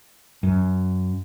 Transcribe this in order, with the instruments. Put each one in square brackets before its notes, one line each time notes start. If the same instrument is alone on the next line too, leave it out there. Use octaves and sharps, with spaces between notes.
[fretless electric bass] F#2